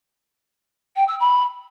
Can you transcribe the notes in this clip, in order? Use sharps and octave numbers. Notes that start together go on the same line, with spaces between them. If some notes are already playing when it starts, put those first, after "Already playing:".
G5
E6
B5